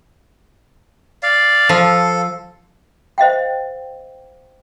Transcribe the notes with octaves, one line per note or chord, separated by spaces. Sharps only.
D5 F5
F3 A4
C5 D#5 F5 G5